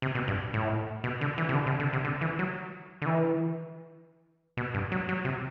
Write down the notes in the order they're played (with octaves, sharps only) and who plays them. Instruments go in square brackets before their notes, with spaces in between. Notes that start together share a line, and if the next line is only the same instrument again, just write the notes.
[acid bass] C3
B2
G2
A2
B2
D3
E3
C3
D3
C3
D3
C3
D3
E3
F#3
D3
E3
B2
G2
F#3
F#3
C3